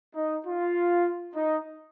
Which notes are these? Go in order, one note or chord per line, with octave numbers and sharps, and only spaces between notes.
D#4
F4
D#4